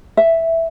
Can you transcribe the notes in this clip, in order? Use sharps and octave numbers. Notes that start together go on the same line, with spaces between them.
E5